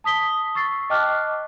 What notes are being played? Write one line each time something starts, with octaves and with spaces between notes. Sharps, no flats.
A5 D#6 B6 G7
C#6 E6 A6 C7
D#5 G5 A5 D6 F6 F#6